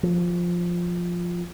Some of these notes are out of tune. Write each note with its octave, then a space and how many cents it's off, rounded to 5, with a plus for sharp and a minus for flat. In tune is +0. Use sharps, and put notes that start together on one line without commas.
F3 +5